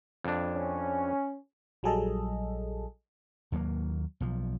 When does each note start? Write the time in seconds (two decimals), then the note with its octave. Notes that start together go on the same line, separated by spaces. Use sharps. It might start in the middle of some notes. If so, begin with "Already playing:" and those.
0.24 F2 D4
0.54 C#4
1.83 A#1 F#3 G3 G#4 A4 D#5
3.52 D#2 F#3 A3 A#3
4.20 B1 F3